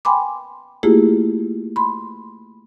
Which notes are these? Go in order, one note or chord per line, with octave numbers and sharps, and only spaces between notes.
G5 G#5 B5 C6 D6
A3 A#3 E4 F4 G4 G#4
B5 C6